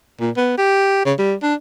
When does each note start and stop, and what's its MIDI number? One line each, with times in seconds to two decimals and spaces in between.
0.20 0.30 46
0.36 0.56 59
0.58 1.00 67
1.05 1.13 49
1.18 1.35 55
1.42 1.54 62